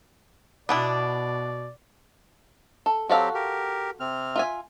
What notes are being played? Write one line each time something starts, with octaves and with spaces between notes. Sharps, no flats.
B2 B3 D4 E4 D5
A4
F#3 C4 F#4 G4 A4 F5
G4 A#4
C3 C4 F6
F4 E5 G#5